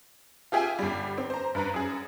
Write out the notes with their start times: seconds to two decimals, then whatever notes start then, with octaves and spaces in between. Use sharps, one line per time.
0.52 F4 G4 G#4 E5 G5 G#5
0.79 G1 G3
1.18 C4
1.30 C5 A#5
1.55 G2 B4 A#5
1.74 F#2 G#4